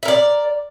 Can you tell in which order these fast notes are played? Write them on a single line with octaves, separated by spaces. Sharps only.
E5 A#4 D5